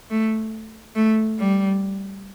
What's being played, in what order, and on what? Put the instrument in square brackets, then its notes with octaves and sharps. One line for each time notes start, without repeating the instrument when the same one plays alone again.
[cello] A3
A3
G3